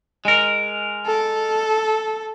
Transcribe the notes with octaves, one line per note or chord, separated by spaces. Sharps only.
G#3 A#4
A4